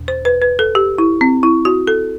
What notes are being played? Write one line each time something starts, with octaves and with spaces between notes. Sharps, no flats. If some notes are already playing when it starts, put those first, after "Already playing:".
Already playing: E2 B2
C5
B4
B4
A4
G4
E4
C4
E4
F#4
A4